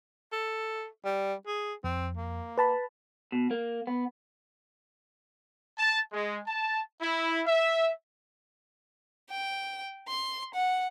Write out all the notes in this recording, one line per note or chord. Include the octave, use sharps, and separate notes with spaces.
A4
G3
G#4
F2 C4
A#3
B4 A5 B5
B2
A#3
B3
A5
G#3
A5
E4
E5
G5
C6
F#5